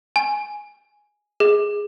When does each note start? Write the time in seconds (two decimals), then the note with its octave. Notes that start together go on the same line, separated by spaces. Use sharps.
0.16 G#5
1.40 G#4